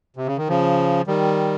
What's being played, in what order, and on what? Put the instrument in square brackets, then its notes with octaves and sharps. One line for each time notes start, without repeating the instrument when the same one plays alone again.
[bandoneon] C3
C#3
D#3
C#3 F3
D#3 G3